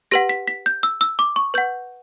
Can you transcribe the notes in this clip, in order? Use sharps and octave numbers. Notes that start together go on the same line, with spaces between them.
G4 B4 F#5 A#6
B6
B6
G6
E6
E6
D6
C#6
B4 F#5 G6